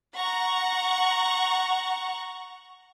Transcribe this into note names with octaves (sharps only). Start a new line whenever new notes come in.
F#5 A#5 C#6